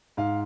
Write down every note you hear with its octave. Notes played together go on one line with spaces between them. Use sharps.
G#2 F5